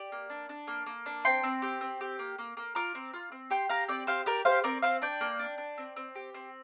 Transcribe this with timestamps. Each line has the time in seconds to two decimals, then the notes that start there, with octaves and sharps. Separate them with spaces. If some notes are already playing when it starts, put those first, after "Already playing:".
Already playing: G4 D5
0.12 A#3
0.30 D4
0.49 D4
0.68 A#3
0.86 A#3
1.06 D4
1.25 C4 G5 C6
1.43 C4
1.62 G4
1.81 C4
2.01 G4
2.19 A#3
2.38 A#3
2.57 A#3
2.75 F4 A#5 D6
2.95 C4
3.14 F4
3.32 C4
3.50 G4 G5 C6
3.69 G4 F5 A#5
3.88 C4 D5 G5
4.07 G4 C5 F5
4.26 G4 A#4 D5
4.45 G4 C5 F5
4.64 C4 A#4 D5
4.82 C4 C5 F5
5.02 D4 D5 G5
5.21 A#3
5.39 D4
5.58 D4
5.78 C4
5.96 C4
6.15 G4
6.35 C4